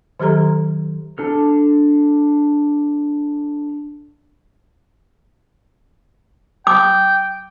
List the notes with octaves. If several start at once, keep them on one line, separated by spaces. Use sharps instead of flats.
D#3 F#3 G4 A4 A#5
D4 A4 F6
G5 D6